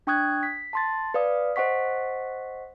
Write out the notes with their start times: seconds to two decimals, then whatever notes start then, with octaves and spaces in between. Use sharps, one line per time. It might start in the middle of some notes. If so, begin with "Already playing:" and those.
0.07 D4 G5 C#6 D#6 F#6 G#6
0.43 B6
0.73 A5 C6 A6
1.14 B4 D5 F5 D#6
1.56 C5 D#5 F#5 C#6 B6